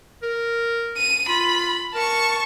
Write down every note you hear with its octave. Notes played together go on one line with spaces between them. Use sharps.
A#4
D#7
F4 B5
A#4 A5 C#6